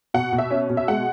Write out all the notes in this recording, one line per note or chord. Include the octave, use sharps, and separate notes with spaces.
B2 F#5
B2
E5
C#4
B2
E5
G#3 F#5